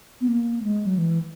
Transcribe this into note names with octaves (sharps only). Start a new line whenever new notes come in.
B3
A#3
G#3
F#3
E3